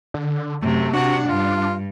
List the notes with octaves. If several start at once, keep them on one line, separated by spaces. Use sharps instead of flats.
D3
F#2 C3 A3
C3 D4 F#4 F#5
G2 F4